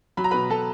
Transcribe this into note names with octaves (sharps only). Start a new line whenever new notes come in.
F#3 B5
A#5
B2 B4 B5
F#3 A4 A5